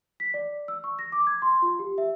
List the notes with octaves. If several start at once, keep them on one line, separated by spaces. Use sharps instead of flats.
B6
D5
E6
C#6
A#6
D6
G#6
C6
F4
G4
E5